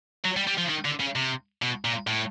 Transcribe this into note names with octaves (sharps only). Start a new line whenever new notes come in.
F#3
G3
G3
F3
D#3
D3
C#3
C3
B2
A#2
A2